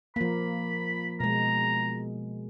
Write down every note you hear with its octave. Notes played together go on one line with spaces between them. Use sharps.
F3 A#3 B5
B2 G#3 A#5